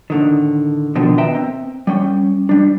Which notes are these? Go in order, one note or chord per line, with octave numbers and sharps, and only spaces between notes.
A2 D3 D#3
B2 D3 D#3 F3
B4 D#5 E5 G5 A#5
C4
G3 C#4 G5
G3 D4